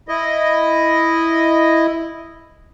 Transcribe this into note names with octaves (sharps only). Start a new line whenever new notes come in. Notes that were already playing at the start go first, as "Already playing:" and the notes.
E4 D#5